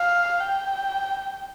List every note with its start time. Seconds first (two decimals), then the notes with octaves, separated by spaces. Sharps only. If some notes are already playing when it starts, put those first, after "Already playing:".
Already playing: F5
0.40 G5